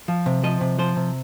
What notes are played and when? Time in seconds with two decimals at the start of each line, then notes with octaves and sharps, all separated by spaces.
0.08 F3
0.26 C3
0.44 F3 D#5
0.61 C3
0.79 F3 C5
0.96 C3